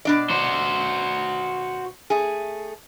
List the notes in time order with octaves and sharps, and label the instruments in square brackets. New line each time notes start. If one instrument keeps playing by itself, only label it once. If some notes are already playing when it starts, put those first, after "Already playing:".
[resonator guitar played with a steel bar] B2 D4 D5
[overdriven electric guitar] F#4 C5
[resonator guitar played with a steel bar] A3 G#4